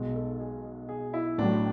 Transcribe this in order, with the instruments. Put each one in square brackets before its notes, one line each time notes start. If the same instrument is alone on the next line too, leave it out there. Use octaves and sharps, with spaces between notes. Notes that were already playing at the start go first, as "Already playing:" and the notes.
Already playing: [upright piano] B1 B2 G#3
[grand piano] A4
G#4
G#4
E4
[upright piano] A1 A2 F#3 [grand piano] D4